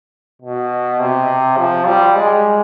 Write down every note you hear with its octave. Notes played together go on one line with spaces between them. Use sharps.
B2
C3
F3
G3
G#3